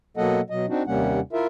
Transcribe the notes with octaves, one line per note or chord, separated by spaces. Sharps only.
B2 F#3 A#3 A4 D#5 F#5
B2 F#3 D#5
C4 D4 D#4 F#4
D#2 C3 G3 A#3 C#4 F#5
E4 F4 A#4 E5